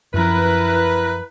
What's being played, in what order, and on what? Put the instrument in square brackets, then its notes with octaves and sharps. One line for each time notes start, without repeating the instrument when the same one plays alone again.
[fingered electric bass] F#2 F3 [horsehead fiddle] E4 A#4 [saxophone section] B4